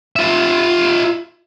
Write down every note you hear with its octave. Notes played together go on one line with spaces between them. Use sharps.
F4 E5